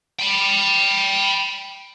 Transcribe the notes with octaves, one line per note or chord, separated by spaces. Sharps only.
G5 B5